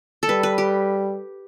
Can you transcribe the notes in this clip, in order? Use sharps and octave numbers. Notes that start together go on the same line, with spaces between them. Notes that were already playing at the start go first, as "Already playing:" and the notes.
A4
G3 B4
B4
G4